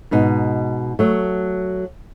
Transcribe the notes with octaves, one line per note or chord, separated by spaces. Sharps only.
G#2 B2 D#4
F#3 A3